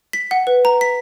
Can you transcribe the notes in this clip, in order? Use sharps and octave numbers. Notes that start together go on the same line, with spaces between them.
B6
F#5
B4
A#5
B6